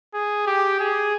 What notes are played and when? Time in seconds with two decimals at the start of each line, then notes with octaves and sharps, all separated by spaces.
0.14 G#4
0.47 G4
0.80 G#4